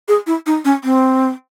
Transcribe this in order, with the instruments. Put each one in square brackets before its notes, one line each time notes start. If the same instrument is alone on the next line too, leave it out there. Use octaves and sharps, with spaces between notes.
[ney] G#4
E4
D#4
C#4
C4